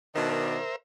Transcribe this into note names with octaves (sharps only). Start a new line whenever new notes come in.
B2 D#3 D4 A#4 C5 E5